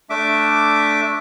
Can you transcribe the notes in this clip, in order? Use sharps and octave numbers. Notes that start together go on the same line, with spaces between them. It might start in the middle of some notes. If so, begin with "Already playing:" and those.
A3 D4 E5 D6